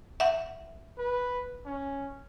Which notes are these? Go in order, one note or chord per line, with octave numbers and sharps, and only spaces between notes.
E5 F#5
B4
C#4